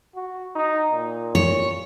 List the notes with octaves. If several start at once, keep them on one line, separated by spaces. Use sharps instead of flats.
F#4
D#4
A#2
C#5